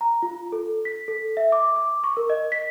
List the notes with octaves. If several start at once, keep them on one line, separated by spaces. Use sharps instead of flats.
A#5
F4
A4
B6
A4
E5
D6
D6
C#6
A#4
D#5
B6